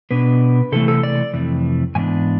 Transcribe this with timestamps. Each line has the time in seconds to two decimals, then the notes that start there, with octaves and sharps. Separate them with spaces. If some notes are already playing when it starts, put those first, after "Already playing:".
0.11 B2 B3 D4 B4
0.72 C3 E3 A3 A4
0.88 A4
1.03 D5
1.34 F2 C3 E3 A3
1.95 G#2 E3 B3 D4 G#5